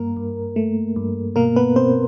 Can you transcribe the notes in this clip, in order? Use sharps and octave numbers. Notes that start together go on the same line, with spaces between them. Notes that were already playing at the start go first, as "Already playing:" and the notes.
Already playing: G2 A#3 A#4
G2
A3
G2
B2 A#3 A#4
B3 B4
B2 C4 C5